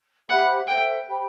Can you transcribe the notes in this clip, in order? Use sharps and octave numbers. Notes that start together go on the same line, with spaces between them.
G4 C5 E5 F#5 B5
A4 C5 E5 G5
G4 C5 G5 B5